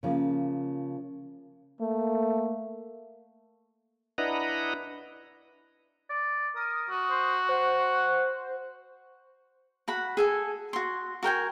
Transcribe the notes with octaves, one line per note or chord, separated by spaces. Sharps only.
C#3 F3 A#3
A3 A#3
D4 E4 B4 D#5 F#5 A#5
D5
A#4 D#6
F#4
C5
C5 F#5
F#4 F#5 B5
G#4 A4 G#5
F#4 C6
F#4 A#4 G5 G#5